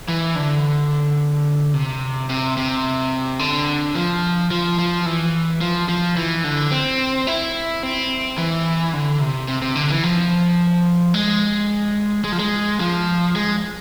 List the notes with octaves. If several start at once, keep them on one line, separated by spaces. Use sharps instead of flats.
E3
D3
C3
C3
C3
D3
F3
F3
F3
E3
F3
F3
E3
D3
C4
E4
C4
E3
D3
C3
C3
C3
D3
E3
F3
G#3
G#3
F3
G#3
F3
G#3